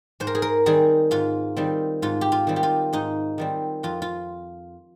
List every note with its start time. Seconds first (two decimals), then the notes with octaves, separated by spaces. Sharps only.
0.20 G#2 C5
0.27 A#4
0.35 G#4
0.42 A#4
0.66 D#3 G3 C4 G#4
1.11 G#2 F4
1.57 D#3 G3 C4
2.02 G#2 F4
2.21 G4
2.32 F4
2.47 D#3 G3 C4
2.56 G4
2.63 F4
2.93 G#2 D#4
3.38 D#3 G3 C4
3.83 F2 F4
4.02 F4